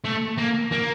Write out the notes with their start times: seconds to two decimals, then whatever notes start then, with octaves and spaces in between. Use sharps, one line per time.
0.05 A3
0.38 A#3
0.72 A#3